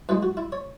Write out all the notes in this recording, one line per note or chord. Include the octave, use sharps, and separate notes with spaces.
F#2 E3 G#3 B4
F#4
E4
C#5